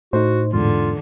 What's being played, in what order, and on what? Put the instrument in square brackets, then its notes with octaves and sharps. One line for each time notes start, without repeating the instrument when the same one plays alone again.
[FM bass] A2 [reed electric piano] D#4 C5 [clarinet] F#4
[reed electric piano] E2 G#2 [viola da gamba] D3 [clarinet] F4